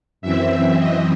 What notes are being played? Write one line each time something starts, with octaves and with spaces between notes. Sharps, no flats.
F#2 E3 C4 E5
E5
D#5